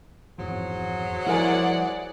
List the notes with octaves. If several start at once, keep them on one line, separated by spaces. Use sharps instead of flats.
F2 G#2 E3 F#3 G#4 C5
F3 G3 E4 A#4 D5 F#5 G#5